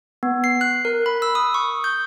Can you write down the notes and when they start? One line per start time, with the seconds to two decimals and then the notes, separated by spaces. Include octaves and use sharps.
0.23 B3
0.44 C7
0.61 F#6
0.85 A#4
1.06 B5
1.22 E6
1.35 D#6
1.54 C#6
1.84 G6